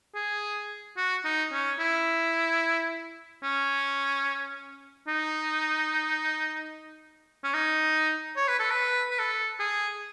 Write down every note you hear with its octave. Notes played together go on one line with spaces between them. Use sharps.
G#4
F#4
D#4
C#4
E4
C#4
D#4
C#4
D#4
C#5
B4
A4
B4
B4
A4
G#4